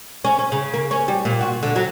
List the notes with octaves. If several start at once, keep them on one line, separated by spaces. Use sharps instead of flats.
C#4
C#4
C#3
A#3
C#4
G3
A#2
F#4
D3
F#3